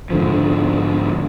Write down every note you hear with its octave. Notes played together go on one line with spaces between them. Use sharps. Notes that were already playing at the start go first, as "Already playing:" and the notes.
G#2 D3 F3